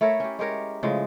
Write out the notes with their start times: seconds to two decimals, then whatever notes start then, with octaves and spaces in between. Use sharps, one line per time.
0.01 A3 E4 A#4 C#5
0.20 C#4 G4
0.39 G#3 G4 A#4 C#5
0.83 A2 C#3 F3 G#3